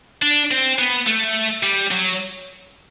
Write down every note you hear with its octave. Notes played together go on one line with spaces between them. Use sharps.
D4
C4
B3
A3
G3
F#3